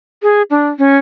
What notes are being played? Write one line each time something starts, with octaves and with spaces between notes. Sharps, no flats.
G#4
D4
C#4